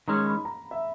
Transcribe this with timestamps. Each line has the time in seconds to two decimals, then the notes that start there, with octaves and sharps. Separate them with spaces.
0.08 D#3 G#3 C#4 A#5
0.26 B5
0.45 A#5
0.71 E5